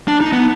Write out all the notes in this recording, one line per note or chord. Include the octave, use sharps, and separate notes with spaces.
D4
D#4
B3